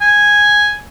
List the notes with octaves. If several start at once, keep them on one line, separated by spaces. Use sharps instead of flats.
G#5